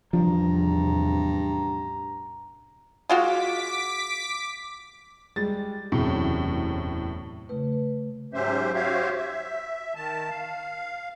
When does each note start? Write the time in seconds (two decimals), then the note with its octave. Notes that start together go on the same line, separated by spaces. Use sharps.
0.13 A1 E2 G2 C3 F3 D4 A#5
3.10 G#3 F4 F#4 D6 B6
5.36 G3 G#3 A6
5.92 E1 F#2 A2 C3
7.49 C#3 A3 B4
8.34 G#2 F#3 C#4 G4 C5 E5
8.74 F#4 G4 C5 C#5 E5 F5
9.17 E5
9.95 D#3 A5
10.30 F5